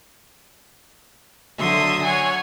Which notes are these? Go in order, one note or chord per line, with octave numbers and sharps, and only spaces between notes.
D3 F#3 E5 C6 D#6
C#5 F#5 G#5